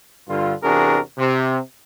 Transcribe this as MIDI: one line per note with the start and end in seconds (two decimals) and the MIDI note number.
0.29 0.53 43
0.29 0.53 50
0.29 0.53 65
0.63 0.99 40
0.63 0.99 48
0.63 0.99 62
0.63 0.99 66
0.63 0.99 68
0.63 0.99 70
1.18 1.59 48